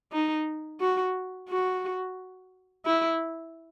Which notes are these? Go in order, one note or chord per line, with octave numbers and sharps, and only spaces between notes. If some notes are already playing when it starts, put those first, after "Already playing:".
D#4
F#4
F#4
E4